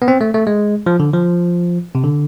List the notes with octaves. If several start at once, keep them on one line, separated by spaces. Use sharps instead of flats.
B3
C4
A3
A3
G#3
F3
D3
F3
C3
D3